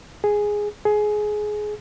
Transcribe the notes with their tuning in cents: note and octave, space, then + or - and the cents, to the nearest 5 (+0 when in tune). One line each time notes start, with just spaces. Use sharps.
G#4 +0
G#4 +20